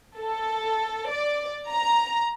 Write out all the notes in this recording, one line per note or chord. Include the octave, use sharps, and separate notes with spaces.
A4
D5
A#5